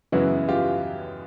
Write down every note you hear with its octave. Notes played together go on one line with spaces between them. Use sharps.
F#2 C#3 E3 G#3 B3 E4 F#4
F4 G4